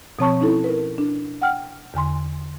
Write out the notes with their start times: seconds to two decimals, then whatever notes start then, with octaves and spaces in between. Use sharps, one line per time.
0.19 B2 F3 C4 C#5 A5 C#6
0.41 C#4 D#4 E4 A4
0.64 A#4 B4
0.98 D4
1.42 F#5 G5 F6
1.94 E2 D3 G#5 C6